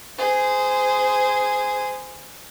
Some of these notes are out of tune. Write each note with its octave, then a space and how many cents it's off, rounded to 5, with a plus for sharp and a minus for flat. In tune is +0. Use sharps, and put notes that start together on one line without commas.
G#4 +0 C5 -25